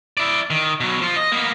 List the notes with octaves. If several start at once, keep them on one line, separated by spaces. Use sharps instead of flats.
E4 D5
D#3
B2 F#3
F3 F4
D#5
A#3 B3